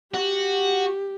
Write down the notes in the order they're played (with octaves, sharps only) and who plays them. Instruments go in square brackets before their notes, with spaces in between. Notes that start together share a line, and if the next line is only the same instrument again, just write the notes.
[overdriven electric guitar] F#4 [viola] G4